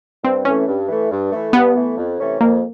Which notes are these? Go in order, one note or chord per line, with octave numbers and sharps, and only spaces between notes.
G2 C4
E3 A3 C#4
G2
E3 A3
G2
E3 A3
G2 B3
E3 A3
F2
C3 E3 A3 C#4
F2 A#3